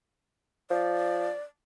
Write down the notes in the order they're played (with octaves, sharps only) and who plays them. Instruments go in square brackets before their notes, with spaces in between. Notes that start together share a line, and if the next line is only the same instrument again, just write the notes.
[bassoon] F3 [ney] D5